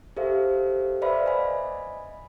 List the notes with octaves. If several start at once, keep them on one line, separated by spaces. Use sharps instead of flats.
G4 A4 C5 E5 F5
B4 C5 D5 E5 F5 B5
D#5 G#5 B5